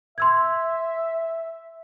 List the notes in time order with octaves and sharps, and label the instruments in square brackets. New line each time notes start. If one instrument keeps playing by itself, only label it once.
[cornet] E5 [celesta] C6 E6 G#6